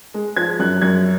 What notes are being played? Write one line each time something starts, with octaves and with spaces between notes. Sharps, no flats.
G#3
F3 G#6
F#2 F#6
F#2 G#6